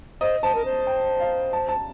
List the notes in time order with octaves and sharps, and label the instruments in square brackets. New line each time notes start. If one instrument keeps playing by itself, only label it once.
[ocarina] C5 [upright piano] D#5
[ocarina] C5 [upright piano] A5
[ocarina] A#4
C5
[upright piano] G5
F5
A5
A5